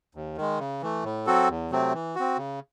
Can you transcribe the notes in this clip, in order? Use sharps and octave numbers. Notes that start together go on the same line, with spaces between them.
D#2
D#3 G#3
C#3
E3 A3
A2
F#3 C4 F#4 A4
E2
C3 F#3 A3 C4
E3
C4 F#4
C#3